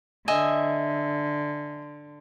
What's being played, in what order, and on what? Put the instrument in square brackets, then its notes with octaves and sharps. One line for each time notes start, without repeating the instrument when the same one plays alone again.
[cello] D3 [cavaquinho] D#5 E5 G#5